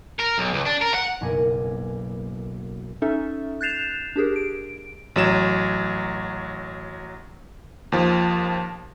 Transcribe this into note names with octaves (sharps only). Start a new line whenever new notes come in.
A#4
B1
C#2
D4
A#4
F#5
F#1 B1 A#3 G#4 G#5 D#7
C#4 D#4 A4 E5
F#6 G6 A6 C7 E7 F7
D4 G4 G#4 A#4
D7
A1 F#3 E7
D#2 F3